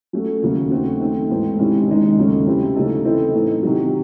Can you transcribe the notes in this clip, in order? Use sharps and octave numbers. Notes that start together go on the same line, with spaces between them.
F#3 A3 C#4 F#4 A4
D#2 C#3 F#3 A3
D#3 A3 C4 F#4
D#3 A3 C4
G#2 E3 A3 C4
C3 D#3 G#3 C#4 E4
D#2 D#3 G#3 D#4
D#2 C#3 F#3 A3 C#4
C3 F#3 C4 E4
C#3 F#3 A3 D#4 A4
E3 C4 E4 A4 D#5
A2 E3 A3 D#4
C3 D#3 F#3